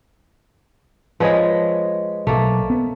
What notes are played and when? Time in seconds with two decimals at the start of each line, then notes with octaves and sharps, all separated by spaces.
1.20 F3 G#3 B4 C#5 D#5
2.27 B1 A3 A#3
2.70 B3